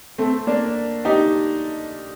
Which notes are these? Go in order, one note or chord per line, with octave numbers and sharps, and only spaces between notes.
A3 C4
A#3 D4
D#4 G4